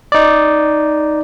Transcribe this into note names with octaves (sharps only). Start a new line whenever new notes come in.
D#4 D5